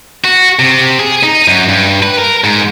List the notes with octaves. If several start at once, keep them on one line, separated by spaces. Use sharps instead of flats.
F#4
C3
G#4
D#4
F#2
G2
B4
A#4
G#2